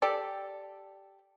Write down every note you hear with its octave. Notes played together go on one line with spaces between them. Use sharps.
G4 A4 D5